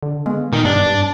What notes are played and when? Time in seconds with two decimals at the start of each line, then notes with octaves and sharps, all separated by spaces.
0.03 D3
0.26 G#3 B3
0.53 A#2 D#3
0.65 G2 D4
0.86 G2